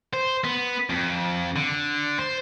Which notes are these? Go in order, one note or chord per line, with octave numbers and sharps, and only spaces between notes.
C5
B3
F2
D3
C5